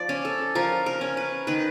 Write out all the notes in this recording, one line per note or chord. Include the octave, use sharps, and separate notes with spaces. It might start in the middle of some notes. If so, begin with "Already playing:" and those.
Already playing: F3 D5
C#4
A4
F3 A#4
A#4
C#4
B4
D#3 B4